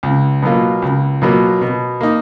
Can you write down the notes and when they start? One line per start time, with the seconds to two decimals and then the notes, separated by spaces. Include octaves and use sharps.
0.03 C#2
0.42 B2 F#3 A#3 F4
0.82 C#2
1.22 B2 F#3 A#3 F4
1.61 B2
2.01 A#3 D#4